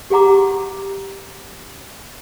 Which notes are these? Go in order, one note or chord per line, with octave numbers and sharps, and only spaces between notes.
G4 G#4 F#5 A#5 D6